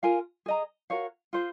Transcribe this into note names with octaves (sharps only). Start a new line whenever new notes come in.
F4 A#4 F5 G#5
G#4 D#5 A#5
F#4 A#4 C#5 F5
F4 G#4 C5